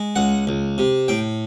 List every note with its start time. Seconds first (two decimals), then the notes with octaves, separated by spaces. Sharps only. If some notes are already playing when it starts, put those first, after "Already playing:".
Already playing: G#3
0.16 C#2 F#5
0.47 C#2
0.78 C3
1.08 A2 G5